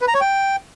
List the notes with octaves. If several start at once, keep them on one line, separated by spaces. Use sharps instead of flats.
B4
A#5
C#5
G5